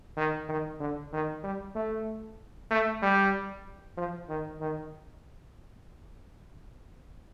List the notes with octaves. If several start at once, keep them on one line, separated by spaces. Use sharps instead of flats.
D#3
D#3
D3
D#3
G3
A3
A3
G3
F3
D#3
D#3